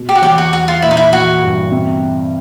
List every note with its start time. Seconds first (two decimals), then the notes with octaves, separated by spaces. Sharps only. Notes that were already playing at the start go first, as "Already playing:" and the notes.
Already playing: B2
0.09 G4
0.15 F#4
0.22 E2 G4
0.38 F#4
0.53 G3 F#4
0.68 F4
0.82 A#2 E4
0.91 D#4
0.97 E4
1.13 E3 F#4
1.43 G2
1.72 C3